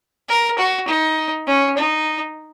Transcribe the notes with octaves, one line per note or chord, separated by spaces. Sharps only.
A#4
F#4
D#4
C#4
D#4